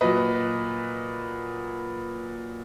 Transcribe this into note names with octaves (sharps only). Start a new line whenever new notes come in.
A#2 F#3 B4 D#5